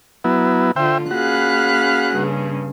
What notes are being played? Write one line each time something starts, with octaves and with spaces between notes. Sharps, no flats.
F#3 B3 E4
D3 F4 C5 E5 G5
A#3 C#4 F#4 G#4 F5 B5 F#6
G2 C#3